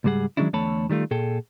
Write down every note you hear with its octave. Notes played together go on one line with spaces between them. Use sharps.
C#2 G#2 G3 G#4 F#5
D#3 F#3 G#3 C#4 D4 E4
E2 D3 A3 C#5 A5 B5
D#3 G3 A3 F4
A#2 G#4 A4 G5